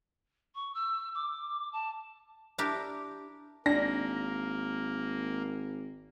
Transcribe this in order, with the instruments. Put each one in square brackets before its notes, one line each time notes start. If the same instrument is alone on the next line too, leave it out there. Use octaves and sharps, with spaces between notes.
[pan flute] C#6
E6
D6
A5
[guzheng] D4 E4 G4 A#4
[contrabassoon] G#1 [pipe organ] A#3 [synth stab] D4 [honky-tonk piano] A#6